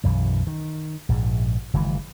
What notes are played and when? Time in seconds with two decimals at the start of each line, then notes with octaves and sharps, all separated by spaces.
0.04 B1 F#2 E3
0.47 D#3
1.09 A#1 G#2
1.74 F#1 D#3 E3 G#3